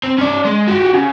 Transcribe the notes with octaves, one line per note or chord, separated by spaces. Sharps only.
C4
C#4 D5
G#3
F#4 G4
C#3